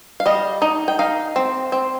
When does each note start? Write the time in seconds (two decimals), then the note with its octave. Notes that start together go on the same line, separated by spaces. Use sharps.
0.20 F5
0.26 G3 D#5
0.62 D#4
0.88 G5
0.99 D#4 F5
1.36 C4
1.72 C4